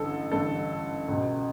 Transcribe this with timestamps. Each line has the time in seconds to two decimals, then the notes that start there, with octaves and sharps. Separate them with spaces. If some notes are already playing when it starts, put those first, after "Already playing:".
Already playing: A1 G2 D3 A4
0.32 A1 G2 D3 A4
1.08 C#2 B2